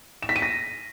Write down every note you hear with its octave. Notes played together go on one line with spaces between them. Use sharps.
E7
B6
D#7
A#6